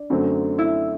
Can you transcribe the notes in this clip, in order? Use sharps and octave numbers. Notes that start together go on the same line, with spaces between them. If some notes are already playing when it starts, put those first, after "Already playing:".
Already playing: D4
F#2 D3 F#3 A3 C4
E4